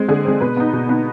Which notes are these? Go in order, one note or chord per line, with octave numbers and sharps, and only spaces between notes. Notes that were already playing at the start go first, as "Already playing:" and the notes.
Already playing: G#3 C4
D3 G#4
G#3 C4
B2 B4
B3 D#4
B2
B3 D#4